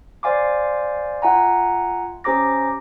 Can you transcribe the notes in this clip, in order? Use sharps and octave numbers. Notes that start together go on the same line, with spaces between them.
C5 D5 F5 G#5 C6 D6
F4 E5 F#5 G#5 A#5
C#4 G4 C5 A#5 D6 A#6